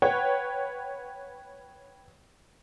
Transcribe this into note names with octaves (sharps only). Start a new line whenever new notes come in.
B4 C#5 F#5 G5